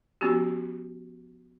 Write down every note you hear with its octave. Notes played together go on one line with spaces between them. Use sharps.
F3 B3 C#4 F#4 G4